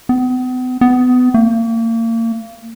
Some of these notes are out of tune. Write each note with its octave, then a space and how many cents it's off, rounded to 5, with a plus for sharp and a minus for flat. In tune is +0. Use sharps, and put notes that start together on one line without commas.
B3 +40
B3 +25
A#3 -35